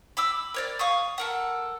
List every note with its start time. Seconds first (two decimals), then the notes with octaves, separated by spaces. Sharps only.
0.17 B5 D6 E6
0.54 A#4 C#5 D5
0.79 F5 C#6 D#6
1.18 A4 A#4 F#5